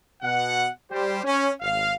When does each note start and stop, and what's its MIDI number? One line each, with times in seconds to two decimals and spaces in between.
0.22 0.68 47
0.22 0.68 78
0.91 1.20 55
0.91 1.20 67
0.91 1.20 72
1.24 1.51 61
1.61 1.94 32
1.61 1.94 77